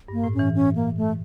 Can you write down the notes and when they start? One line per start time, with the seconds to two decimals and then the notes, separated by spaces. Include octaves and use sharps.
0.08 G2 A#3
0.24 A2
0.34 E3 C#4
0.55 C#4
0.76 A#3
0.97 A3